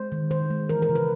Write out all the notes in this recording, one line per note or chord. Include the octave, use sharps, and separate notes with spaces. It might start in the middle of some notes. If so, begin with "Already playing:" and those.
Already playing: G#3 C5
D#3
D#3 C5
G#3
E3 A#4
A#4
C#3
B4